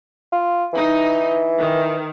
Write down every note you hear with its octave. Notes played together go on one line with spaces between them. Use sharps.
F4
E3 D#4
D#3